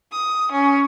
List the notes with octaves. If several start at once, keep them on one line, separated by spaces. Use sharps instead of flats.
D#6
C#4